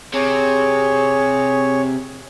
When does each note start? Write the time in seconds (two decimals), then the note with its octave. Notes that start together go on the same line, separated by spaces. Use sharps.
0.14 C3 G#4 C#5